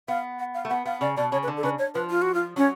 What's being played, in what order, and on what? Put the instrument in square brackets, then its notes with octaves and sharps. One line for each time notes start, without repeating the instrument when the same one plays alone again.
[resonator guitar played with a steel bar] B3 [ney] F5
[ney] F#5
F5
[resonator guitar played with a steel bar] A3
[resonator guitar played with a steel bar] B3 [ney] F#5
[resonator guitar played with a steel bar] B3 [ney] F5
[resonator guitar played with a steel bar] C#3 [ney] D5
[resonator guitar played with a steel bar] B2 [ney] D5
[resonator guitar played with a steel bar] C#3 [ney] C#5
[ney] B4
[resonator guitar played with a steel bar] D3
[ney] A4
[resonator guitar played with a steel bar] C#3 [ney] B4
[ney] C#5
[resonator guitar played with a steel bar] F3 [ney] B4
[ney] F4
F#4
F4
[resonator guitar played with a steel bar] F#3 [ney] C#4